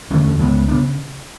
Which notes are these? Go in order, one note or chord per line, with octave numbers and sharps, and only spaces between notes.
E2 D3 A3 C#4
C#2 C#3 G#3 B3
C#3 B3 D4